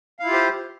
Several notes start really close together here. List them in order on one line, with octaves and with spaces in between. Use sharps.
F5 E4 F4 G4 C5